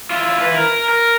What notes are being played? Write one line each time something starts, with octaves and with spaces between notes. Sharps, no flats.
E4 F4
E4 B4
A#4
A#4